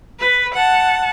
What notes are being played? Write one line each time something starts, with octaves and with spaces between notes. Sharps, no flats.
B4
F#5 A5